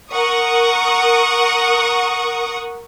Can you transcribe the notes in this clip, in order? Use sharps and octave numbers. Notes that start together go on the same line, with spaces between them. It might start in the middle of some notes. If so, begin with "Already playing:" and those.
A#4 F#5 C#6 D#6